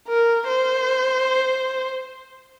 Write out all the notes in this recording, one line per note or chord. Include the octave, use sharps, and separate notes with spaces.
A#4
C5